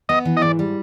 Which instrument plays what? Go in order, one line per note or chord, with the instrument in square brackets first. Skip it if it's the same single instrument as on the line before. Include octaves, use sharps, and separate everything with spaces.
[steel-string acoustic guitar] B3 [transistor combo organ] D#5
[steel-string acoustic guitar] E3
[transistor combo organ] D#5
[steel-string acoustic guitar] G#2 [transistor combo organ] D5
[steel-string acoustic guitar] G3